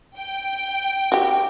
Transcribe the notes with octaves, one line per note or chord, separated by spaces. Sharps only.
G5
F#4 G4